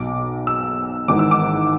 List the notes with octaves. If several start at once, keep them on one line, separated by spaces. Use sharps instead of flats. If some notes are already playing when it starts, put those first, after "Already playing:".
Already playing: B1 B2 D6
E6
G#1 G#2 E3 D6
E6
D6